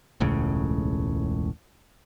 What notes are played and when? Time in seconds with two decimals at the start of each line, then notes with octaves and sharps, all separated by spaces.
0.20 E1 C#2 A2 C#3